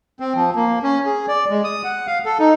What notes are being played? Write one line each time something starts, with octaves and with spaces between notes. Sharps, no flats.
C4
F3
A#3
C#4
G#4
D5
G#3
D#6
F#5
F5
A4
D#4